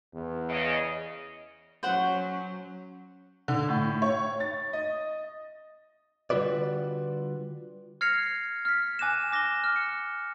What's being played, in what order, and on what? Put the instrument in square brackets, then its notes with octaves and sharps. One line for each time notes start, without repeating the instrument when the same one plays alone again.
[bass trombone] E2
[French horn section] C#3 D#5
[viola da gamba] F#3 C#4 [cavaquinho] C5 F#5
[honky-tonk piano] D3
A2
C#5
A6
D#5
[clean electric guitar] D3 G3 F4 F#4 B4 D5
[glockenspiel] F6 G#6 A#6 C7 C#7 F7
F6 B6
G#5 D6 F#6 A#6 E7
D6 A#6 E7 G7
F6
C#7